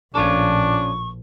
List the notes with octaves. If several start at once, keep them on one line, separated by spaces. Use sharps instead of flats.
A#1 A2 F3 C#4 D4 F4 A4 C#6